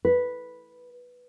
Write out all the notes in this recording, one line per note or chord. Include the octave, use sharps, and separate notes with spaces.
B4